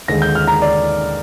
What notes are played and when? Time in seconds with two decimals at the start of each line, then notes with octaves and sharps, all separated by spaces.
0.08 D#2 D3 G#3 A#6
0.22 G6
0.35 F6
0.47 A#5
0.62 D5